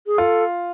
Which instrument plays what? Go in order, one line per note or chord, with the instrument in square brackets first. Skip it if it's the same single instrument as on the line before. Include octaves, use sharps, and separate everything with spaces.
[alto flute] G#4
[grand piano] F4 [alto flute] A4